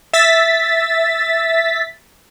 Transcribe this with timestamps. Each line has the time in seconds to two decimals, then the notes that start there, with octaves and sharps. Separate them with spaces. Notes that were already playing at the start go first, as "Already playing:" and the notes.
0.13 E5 A6 B6